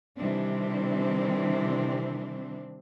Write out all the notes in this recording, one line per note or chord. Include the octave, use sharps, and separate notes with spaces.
C3 D#3 E3 G3 C4 D4